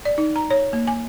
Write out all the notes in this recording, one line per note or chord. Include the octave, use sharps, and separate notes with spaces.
D5
D#4
A#5
C#5
A#3
G#5